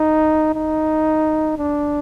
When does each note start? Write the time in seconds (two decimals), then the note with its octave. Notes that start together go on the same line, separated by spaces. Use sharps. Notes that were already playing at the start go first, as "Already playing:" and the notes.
Already playing: D#4
0.55 D#4
1.58 D4